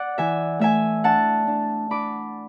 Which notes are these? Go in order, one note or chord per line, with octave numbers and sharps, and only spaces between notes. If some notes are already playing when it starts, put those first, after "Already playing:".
Already playing: D5 F#5
E3 E5 G#5
A3 E5 G#5
D4 F#5 A5
D4
D4 B5 D6